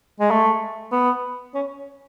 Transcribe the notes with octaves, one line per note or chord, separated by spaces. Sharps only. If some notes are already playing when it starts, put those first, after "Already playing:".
G#3
A3
B3
C#4